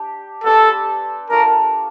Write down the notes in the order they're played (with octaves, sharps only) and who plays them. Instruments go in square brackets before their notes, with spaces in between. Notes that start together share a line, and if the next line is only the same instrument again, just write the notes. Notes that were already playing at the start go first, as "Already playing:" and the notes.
Already playing: [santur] D4 G4
[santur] B3 D4 G4 C5 [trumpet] A4
[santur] D4 F4 A4 C#5 [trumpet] A#4